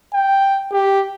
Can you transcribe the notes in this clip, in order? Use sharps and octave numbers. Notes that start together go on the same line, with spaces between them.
G5
G4